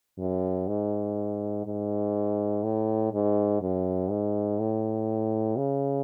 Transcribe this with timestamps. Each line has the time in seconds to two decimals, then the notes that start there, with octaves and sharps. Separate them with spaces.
0.18 F#2
0.67 G#2
1.65 G#2
2.63 A2
3.13 G#2
3.61 F#2
4.10 G#2
4.59 A2
5.57 C#3